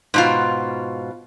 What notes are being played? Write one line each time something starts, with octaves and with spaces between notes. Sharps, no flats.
G#2 B2 F4